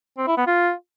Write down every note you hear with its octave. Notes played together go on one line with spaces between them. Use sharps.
C4
E4
B3
F4